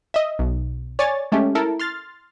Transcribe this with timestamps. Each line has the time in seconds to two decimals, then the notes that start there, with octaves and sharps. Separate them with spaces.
0.14 D#5 E5
0.39 B1
0.99 C#5 D5 G#5 A6
1.32 G#3 A3 C#4 G4
1.55 E4 A4 A#4
1.80 C6 F6 A6